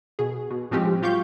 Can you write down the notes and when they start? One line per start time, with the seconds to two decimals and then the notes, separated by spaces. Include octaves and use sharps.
0.19 B2 G#4
0.51 B2
0.71 A2 F3 G#3 C4 C#4 G4
1.02 F#3 F4 G4 F5 C#6 G6